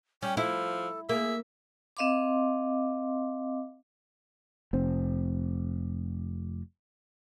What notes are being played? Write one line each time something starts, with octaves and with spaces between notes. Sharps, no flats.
G3 C#4 G5
F3 E4 A4
A#3 G#4 E5
C4 D#5 F5 C6 D6
F1 C4